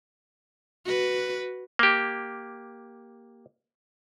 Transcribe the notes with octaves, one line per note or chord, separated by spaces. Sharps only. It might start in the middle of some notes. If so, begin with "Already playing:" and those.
F#4 B4
A#3 G4